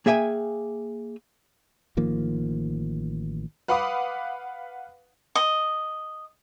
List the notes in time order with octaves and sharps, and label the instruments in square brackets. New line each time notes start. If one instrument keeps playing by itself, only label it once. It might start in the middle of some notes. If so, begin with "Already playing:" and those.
[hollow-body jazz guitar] A#3 G#4 E5 G5 G#5
[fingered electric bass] A1 D#3 F3 A#3
[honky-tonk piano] B4 F5 F#5 B5 D6 D#6
[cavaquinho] D#5